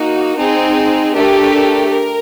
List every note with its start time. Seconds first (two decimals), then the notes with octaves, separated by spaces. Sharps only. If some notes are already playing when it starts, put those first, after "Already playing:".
Already playing: A#3 D#4 F#4
0.36 C4 D#4 G#4
1.13 A3 D4 G4 A#4
1.90 A#4